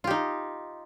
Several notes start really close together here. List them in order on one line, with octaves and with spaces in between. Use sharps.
F4 G4 D#4